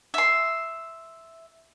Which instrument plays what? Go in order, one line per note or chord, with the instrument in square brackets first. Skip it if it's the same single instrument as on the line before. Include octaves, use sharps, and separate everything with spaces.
[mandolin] E5 C6